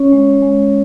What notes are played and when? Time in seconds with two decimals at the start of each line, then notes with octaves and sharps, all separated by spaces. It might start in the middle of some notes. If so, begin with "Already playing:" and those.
Already playing: C#4 C#5
0.12 G#3
0.42 G#3